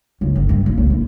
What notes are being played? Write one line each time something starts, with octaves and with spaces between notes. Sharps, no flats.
C#2
G1
G2
A#2
C#2
E4